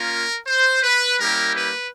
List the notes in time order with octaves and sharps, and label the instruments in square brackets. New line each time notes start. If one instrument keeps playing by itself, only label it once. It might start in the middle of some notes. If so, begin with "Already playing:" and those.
Already playing: [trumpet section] A#3 C#4 F4 A#4
C5
B4
G3 A#3 C#4 E4 G4 A#4
B4